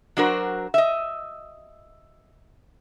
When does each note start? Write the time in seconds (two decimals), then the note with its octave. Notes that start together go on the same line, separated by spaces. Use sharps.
0.17 F#3 D4 F#4 A#4 C5
0.74 D#5 E5